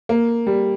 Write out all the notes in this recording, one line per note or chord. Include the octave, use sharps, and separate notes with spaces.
A#3
G3